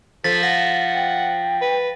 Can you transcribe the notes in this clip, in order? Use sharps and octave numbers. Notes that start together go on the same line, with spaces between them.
F3 A4 A6 B6
F#5 A#6
G5
B4